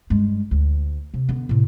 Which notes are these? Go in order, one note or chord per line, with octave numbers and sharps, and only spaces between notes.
G2 G#3
D2
C3
D3 B3
A2 C3